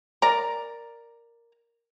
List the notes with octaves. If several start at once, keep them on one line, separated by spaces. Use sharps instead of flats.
A#4 D5 A#5